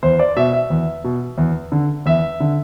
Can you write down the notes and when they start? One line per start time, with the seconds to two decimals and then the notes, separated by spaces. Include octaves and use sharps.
0.03 E2 C5
0.19 D5
0.36 B2 E5
0.53 E5
0.70 E2
1.04 B2
1.38 E2
1.72 D3
2.06 E2 E5
2.40 D3